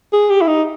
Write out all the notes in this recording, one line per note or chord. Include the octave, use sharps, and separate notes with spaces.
G#4
G4
E4
D#4